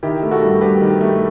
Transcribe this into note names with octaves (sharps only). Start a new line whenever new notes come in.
D#3 E4 G4
A3
F#4 A4
G2
G2 G4 B4
D#3
A3